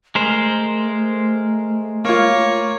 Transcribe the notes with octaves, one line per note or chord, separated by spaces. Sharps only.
G#3 A3 A#4 C5
A#3 F4 C#5